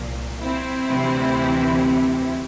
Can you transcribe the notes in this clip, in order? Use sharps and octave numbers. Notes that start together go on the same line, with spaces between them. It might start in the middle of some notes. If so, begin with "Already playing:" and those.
Already playing: C2 A#2 F3 A#3
C4 E4
D2 C3 E3